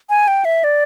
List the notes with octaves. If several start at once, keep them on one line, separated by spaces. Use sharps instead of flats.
G#5
G5
E5
D5